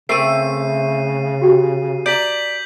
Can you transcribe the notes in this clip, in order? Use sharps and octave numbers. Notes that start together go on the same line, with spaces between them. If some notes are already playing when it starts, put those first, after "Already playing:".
C#3 A3 C4 A#4 D6 C7 D#7
F#4 G4 G5
D5 A#5 G6 B6 F#7